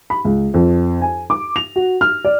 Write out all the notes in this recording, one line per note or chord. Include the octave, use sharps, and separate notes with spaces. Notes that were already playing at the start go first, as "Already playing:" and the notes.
B5
C#2
F2
G#5
D6
F7
F#4
F6
D5